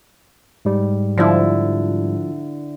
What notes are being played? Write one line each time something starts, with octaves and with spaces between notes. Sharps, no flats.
G#2 G3
D3 F3 E4